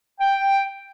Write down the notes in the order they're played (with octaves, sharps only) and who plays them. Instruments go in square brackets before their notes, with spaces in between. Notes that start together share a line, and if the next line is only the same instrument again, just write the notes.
[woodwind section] G5